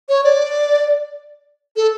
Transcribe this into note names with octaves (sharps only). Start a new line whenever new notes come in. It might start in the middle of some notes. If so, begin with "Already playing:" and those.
C#5
D5
A4